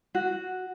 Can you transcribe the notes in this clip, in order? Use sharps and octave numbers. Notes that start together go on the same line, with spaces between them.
F#4